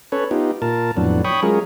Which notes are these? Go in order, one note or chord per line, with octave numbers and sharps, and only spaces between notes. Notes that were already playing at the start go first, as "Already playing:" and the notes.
C#4 A4 B4 C#5
B3 D#4 F4 G4
A#2 F4 A#4 A5
F2 A2 E3 F#3 B3 D4
C#5 G5 B5 C#6 D#6
F#3 G#3 C#4 F4 G#4 A#4